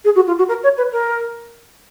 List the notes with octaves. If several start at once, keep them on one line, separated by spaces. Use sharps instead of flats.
G#4
F#4
F4
F#4
A#4
C#5
B4
A#4